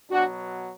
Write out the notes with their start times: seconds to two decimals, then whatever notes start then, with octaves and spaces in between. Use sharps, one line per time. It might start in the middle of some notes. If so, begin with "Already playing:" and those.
0.10 B2 F#3 B3 D4 F#4